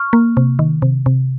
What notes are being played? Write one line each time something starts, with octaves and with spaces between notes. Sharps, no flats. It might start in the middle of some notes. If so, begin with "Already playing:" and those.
Already playing: C#6 F6
A#3
C3
D#3
C3
C3